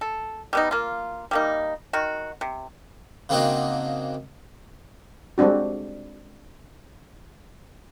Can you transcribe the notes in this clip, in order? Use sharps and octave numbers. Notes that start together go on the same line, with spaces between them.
A4
G3 B3 D#4
A#3 F4
G3 A#3 D#4
D#3 F#4
C3
C#3 A#3 C4 D4 D#4 F#4
G3 G#3 C4 D4 F#4